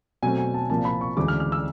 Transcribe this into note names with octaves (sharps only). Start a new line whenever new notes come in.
B2 F#3 A3 C4 G#5
G#5
A5
C2 A#2 F3 A#3 A5
B5
C#6
D2 C#3 E3 G#3 D6
F6
F6
E6